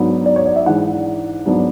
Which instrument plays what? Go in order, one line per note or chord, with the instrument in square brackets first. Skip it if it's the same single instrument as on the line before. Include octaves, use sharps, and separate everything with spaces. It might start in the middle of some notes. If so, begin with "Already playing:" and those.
Already playing: [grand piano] G#2 F#3 B3 D4
D5
C#5
D5
E5
G#2 E3 G#3 D4 F#5
G#2 F#3 B3 D4